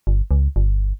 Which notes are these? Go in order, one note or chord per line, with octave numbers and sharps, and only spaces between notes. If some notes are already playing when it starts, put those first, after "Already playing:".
G1
C#2
G1